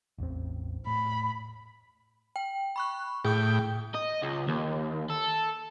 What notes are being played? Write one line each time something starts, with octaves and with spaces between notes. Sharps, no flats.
A1 E2 C4
A2 B5
G5
B5 C#6 F#6
A2 G#4 G5 D#6 G6
D#5
C#2
D#2
A4